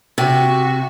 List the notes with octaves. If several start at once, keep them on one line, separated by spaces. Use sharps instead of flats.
C3 F#4